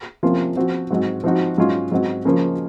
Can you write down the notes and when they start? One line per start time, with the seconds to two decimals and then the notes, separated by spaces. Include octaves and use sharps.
0.23 C3 F3 A#3 C#4 F4
0.57 F3 C4 F#4
0.90 G#2 F#3 C4 F#4
1.24 F3 C4 D#4 F#4
1.58 G#2 F#3 C#4 F4
1.91 G#2 F#3 C4 F#4
2.25 C#3 F3 A#3 C#4